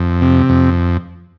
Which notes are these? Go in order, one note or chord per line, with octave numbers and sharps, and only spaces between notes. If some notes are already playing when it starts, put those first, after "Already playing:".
Already playing: F2
C3
F2